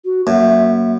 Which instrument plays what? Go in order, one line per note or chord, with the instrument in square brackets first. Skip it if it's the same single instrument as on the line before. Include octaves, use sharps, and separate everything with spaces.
[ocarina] F#4
[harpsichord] F#2 [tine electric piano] A#3 [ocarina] E5